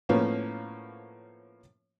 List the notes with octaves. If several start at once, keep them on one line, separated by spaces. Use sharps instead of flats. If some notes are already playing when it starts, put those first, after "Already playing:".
A2 F3 A#3 B3 C#4